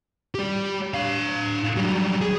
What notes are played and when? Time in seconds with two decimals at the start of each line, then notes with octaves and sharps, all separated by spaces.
0.35 G4 D5
0.94 D4 F5
1.76 F#3 G3
2.21 G#4